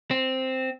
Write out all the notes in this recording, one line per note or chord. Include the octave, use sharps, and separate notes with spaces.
C4